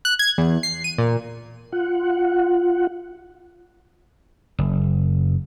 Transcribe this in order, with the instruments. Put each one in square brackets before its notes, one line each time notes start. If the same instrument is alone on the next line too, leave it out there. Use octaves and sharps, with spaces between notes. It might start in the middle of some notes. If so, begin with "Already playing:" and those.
[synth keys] F#6
G#6
E2
C7
D#7
A#2
[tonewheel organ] F4 F#5
[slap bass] F#1